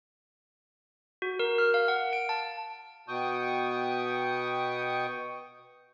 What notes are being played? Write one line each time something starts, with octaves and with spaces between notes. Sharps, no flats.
F#4
A#4
F6
F5
F#5
D7
A5
B2 G5 C#6 D#6